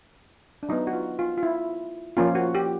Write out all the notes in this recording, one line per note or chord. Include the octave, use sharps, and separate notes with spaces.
D4
F#3 B3 D#4
F#4
F4
F4
F4
E4
F3 A#3 C#4 F4
F#4
G4